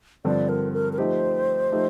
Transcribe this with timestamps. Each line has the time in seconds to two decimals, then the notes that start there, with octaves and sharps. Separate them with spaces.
0.25 G2 D3 F3 C4 D5
0.49 A#4
0.73 A#4
0.93 A#4
0.98 F3 A3 D#4 G4 C5
1.72 F3 A3 D#4 G4